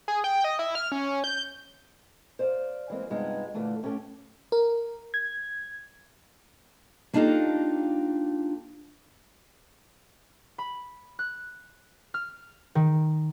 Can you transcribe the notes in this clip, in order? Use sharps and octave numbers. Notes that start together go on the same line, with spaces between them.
G#4
G5
D#5
E4
F6
C#4
C#4
G6
C5 D5 F5
E3 G#3 A#3 C4
G2 C3 G#3 B3 D#4 F4
A#2 D3 E3 A3 A#3
A2 C#4 G4 A4 F5 G5
A#4
G#6
A#3 D4 D#4 F4 G4 A4
B5
F#6
F6
D#3